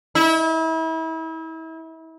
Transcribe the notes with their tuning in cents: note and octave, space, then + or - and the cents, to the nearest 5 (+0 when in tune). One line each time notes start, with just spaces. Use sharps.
E4 -35